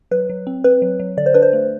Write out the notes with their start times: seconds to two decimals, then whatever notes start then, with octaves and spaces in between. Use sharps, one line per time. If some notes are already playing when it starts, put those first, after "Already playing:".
0.11 F#3 B4
0.30 F#3
0.47 C4
0.64 C4 B4
0.82 F#3
1.00 F#3
1.17 D3 D5
1.26 C5
1.34 D4 B4
1.42 C5
1.53 A3